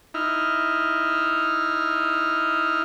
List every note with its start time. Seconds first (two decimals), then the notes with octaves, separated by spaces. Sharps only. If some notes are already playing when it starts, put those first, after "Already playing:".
0.14 D#4 E4 F6